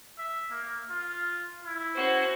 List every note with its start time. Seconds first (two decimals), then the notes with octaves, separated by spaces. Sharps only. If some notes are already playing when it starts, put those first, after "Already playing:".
0.18 E5
0.50 A#3
0.90 F4
1.65 E4
1.95 C#4 F#4 C5